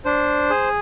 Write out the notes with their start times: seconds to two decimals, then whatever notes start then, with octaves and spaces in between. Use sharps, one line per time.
0.05 D4 C5
0.50 G#4